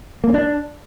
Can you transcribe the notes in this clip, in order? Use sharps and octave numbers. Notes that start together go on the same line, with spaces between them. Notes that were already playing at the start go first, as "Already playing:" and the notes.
A#3
C#4
D4